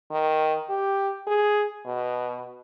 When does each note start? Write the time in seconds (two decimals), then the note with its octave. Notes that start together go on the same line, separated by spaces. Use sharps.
0.11 D#3
0.70 G4
1.27 G#4
1.86 B2